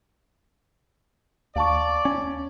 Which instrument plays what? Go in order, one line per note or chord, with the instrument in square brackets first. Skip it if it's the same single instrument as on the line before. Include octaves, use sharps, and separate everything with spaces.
[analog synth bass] D#2 [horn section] D5 [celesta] F5 A5 C#6
[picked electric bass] C#4